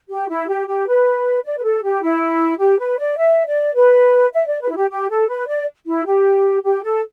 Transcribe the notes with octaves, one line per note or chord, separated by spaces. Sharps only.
G4
E4
G4
G4
B4
D5
B4
A4
G4
E4
G4
B4
D5
E5
D5
B4
E5
D5
B4
E4
G4
G4
A4
B4
D5
E4
G4
G4
A4